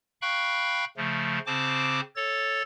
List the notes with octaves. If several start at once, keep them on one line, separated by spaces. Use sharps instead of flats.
F5 G5 B5 C#6 F#6
C#3 F3 A3
C#3 C4 C5 A5 D6
A4 C#5 A6